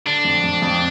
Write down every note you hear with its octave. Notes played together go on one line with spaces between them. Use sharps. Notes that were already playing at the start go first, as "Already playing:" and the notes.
D3 D4
F2
F2
F2